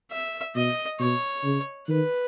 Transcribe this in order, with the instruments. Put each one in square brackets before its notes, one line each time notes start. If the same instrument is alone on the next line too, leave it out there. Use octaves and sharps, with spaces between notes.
[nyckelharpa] E5
[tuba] B2 [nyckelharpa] D#5
[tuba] B2 [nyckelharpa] C#5
[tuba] C#3
[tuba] D#3 [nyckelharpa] B4